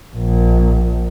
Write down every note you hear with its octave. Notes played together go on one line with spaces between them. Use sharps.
A#1